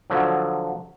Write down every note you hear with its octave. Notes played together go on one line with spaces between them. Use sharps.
D3 F3 F#3